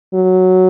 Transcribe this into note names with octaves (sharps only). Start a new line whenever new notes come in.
F#3